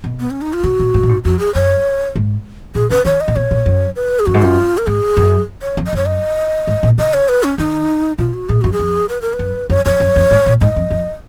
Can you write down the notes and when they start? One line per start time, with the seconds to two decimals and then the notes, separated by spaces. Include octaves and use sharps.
0.04 B2
0.20 B3
0.30 C#4
0.41 D#4
0.53 F4
0.63 B2 F#4
0.79 A#2
0.94 G#2
1.03 A#2
1.09 G#2
1.24 F2 F#4
1.39 G#4
1.55 F#2 C#5
2.16 G#2
2.75 A#2 G#4
2.90 C#3 B4
3.05 D#3 C#5
3.21 D#5
3.28 A#2
3.36 B2 C#5
3.51 A#2
3.66 F#2
3.96 B4
4.19 G#4
4.26 F#2 F#4
4.34 G#2
4.42 F#2 F4
4.78 A#4
4.87 G#2 G#4
5.17 F#2
5.62 C#5
5.77 F2
5.86 D#5
5.93 F#2 C#5
6.06 D#5
6.67 G#2
6.83 A#2
6.98 C#3 D#5
7.14 C#5
7.29 B4
7.44 C#4
7.58 D#3 D#4
8.18 B2 F4
8.34 F#4
8.49 A#2 G#4
8.61 F#2 F#4
8.72 G#4
8.79 F2
9.09 B4
9.22 A#4
9.33 B4
9.39 F#2
9.70 F#2 C#5
9.85 F2 C#5
10.00 F#2
10.16 F2
10.31 G#2
10.46 A#2
10.61 G#2 D#5
10.76 F2
10.90 F2